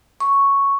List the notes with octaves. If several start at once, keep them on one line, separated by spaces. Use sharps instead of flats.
C#6